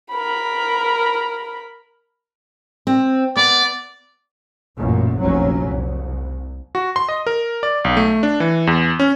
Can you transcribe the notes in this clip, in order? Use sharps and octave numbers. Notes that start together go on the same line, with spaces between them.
A#4 B5
C4
B3 D5
A1 F#2 A#2
F1 A#1 F#3 C#4
C2
F#4
C6
D#5
A#4
D5
B1
A3
D4
E3
E2
C#4